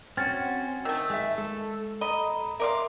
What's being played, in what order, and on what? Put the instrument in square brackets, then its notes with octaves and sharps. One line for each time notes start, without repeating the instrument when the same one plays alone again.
[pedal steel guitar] C4 C#4 F#4 [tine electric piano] F6 G#6 A6
[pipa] D#3 A3 [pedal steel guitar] E6
[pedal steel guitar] G#3 E5
[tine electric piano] G#3 [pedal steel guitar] A4
[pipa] D#5 [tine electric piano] A#5 B5
[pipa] A#4 D5 F5 [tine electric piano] E5 C6